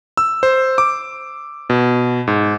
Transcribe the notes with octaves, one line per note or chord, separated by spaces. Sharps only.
E6
C5
D6
B2
G#2